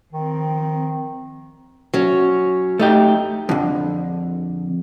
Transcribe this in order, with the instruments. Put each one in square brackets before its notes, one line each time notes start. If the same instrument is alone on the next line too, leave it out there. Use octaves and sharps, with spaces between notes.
[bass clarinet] D#3 [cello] F3 C4
[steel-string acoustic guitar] F#3 C#4
[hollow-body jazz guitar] A3 D#4 G4
F2 D3